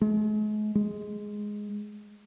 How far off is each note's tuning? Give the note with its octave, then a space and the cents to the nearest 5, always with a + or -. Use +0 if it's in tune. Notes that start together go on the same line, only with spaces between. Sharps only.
G#3 +40
G#3 +0